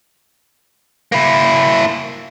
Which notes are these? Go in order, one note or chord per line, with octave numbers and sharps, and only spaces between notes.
A#3 E4